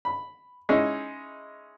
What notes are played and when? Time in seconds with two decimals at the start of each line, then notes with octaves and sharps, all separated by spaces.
0.05 B5
0.69 G#3 C#4 D#4 E4